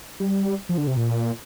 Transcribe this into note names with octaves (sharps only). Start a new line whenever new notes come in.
G3
F3
D3
C3
A#2